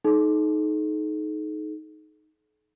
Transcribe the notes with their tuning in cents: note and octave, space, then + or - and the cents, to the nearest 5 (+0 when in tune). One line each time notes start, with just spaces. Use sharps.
D#4 +0 A4 -45